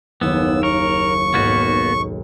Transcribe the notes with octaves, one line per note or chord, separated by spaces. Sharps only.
F#1 D#2 B3 E6
A#4 C#6
B1 G#2 A#3 B3 F#4